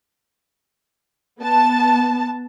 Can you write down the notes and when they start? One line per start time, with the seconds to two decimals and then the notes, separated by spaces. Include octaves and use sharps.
1.40 B3 A5